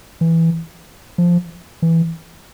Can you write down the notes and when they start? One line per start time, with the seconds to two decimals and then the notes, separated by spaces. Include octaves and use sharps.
0.21 E3
1.18 F3
1.82 E3